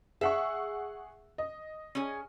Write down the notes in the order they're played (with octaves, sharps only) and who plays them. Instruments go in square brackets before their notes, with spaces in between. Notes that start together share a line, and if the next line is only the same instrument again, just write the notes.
[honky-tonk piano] G#4 F#5 C#6 [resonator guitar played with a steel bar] E5
[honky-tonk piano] D#5
[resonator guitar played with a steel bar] C#4 G#4